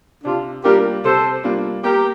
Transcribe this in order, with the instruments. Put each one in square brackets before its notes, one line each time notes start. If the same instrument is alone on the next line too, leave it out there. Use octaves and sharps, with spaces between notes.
[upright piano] C3 [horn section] D4 F4
[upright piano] G3 A#3 D4 F4 [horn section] G4 A#4
[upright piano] C3 [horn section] A4 C5
[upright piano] G3 A#3 D4 F4
[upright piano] A#3 [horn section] G4 A#4